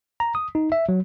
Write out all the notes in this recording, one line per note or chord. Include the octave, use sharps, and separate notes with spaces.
A#5
D#6
D#4
E5
F#3